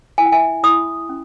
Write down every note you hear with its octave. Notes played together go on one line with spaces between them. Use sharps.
E4 G#5
G5
E5 G#5
E4 B5 D#6
C#4